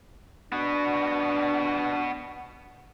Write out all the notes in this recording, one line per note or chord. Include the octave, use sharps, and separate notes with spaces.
B3 D4 F#4